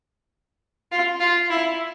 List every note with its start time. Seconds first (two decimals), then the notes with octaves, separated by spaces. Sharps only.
0.92 F4
1.20 F4
1.50 E4